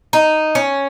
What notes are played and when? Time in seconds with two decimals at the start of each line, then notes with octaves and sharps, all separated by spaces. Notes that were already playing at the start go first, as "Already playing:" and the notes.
0.13 D#4
0.55 C#4